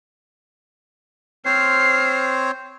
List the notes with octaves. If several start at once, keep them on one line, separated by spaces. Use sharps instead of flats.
C4 C5 C#5 F6 C7